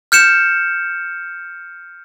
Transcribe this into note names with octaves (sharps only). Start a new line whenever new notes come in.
F6 G6 C#7 E7